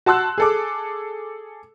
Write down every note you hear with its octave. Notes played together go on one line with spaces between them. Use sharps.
F#4 A5 C6 E6 F#6
G#4 A4 D6